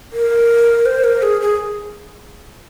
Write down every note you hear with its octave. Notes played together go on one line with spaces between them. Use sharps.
A#4
C5
A#4
G#4
G#4